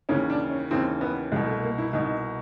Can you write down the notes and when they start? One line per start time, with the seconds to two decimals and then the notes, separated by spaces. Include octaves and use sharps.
0.09 D#2 C#3 E3 C#4
0.30 D4
0.50 C#4
0.71 D#2 C#3 E3 C4
1.01 B3
1.32 C2 B2 G#3
1.47 A3
1.63 A#3
1.78 E4
1.93 C2 B2 D#4